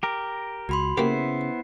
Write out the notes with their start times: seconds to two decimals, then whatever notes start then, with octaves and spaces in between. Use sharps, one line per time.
0.03 G4 A#4
0.69 C#2 F#4 B5 C6
0.97 C#3 A#3 B3 E4 G4 C5 C7